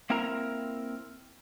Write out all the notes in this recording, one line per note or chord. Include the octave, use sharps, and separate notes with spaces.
A#3 C4 E4 A#4 A#5